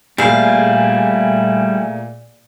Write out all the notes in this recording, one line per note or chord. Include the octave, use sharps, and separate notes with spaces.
A#2 G3 A3 E4 G#4 F5 C7